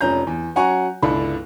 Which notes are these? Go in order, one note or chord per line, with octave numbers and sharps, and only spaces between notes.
F1 F3 C#4 A#5 G6
E2
F#3 C#4 F#5 G#5 A#5 C#6
G1 C#2 D4 E4 A4 B5